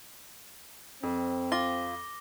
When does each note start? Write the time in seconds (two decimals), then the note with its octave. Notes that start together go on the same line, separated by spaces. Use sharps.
1.03 F2 C4
1.52 F4 D6 A#6 G7